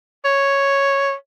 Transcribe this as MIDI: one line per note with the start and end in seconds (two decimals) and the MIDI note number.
0.25 1.13 73